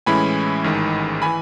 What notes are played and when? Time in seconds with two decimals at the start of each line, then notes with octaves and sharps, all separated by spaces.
0.06 A2 E3 G#3 C#4 E4 G#5 B5
0.64 A1 G#2 D#3
1.22 E3 G#5 B5